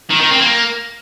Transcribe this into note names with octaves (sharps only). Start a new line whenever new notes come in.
D#3
D#3
C4
A#3